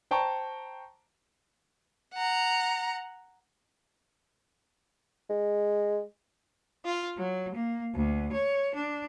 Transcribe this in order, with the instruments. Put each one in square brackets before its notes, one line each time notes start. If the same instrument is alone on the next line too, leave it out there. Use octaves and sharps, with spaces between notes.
[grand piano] C5 G5 A5 A#5 C#6
[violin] F#5 A#5
[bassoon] G#3
[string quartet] F4
F#3
A#3
D2
C#5
D4